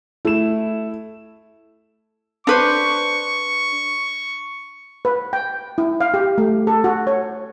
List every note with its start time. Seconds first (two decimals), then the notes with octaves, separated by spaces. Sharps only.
0.25 A3 E4 E7
2.47 D4 B4 C5 C#6
5.05 B4
5.33 G5
5.78 E4
6.01 F5
6.14 G4
6.38 A3
6.67 A4
6.84 F#4
7.07 C#5